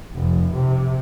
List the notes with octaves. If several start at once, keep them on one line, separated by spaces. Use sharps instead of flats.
F1
C3